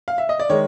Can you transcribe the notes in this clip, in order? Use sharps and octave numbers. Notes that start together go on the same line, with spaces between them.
F5
E5
D#5
D5
D#3 G#3 C#5